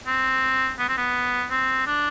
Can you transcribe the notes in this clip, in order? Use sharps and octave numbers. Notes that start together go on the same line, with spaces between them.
C4
B3
C4
B3
C4
D4